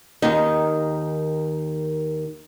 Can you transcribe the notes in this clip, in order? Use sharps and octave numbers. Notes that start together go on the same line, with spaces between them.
D#2 D#3 D#4